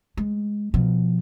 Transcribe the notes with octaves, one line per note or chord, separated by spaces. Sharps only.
G#3
B2 F3